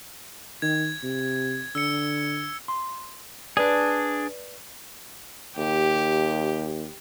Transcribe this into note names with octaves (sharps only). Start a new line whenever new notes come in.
D#3 G#6
C3
D3 E6 C#7
C6
D4 G#4 B4 D5
D#2 G4